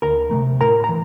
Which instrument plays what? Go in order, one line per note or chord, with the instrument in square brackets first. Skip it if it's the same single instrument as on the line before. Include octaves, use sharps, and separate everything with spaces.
[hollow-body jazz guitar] D2 A#4 A#5
C3 F3 A3
A2 A#4 A#5
A#5
E3